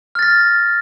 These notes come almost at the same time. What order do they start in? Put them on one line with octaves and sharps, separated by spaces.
F6 A6 A#6